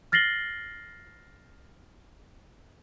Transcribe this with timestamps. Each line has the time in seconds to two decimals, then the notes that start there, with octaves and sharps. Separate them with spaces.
0.12 F6 A6 A#6 C7 F#7 G7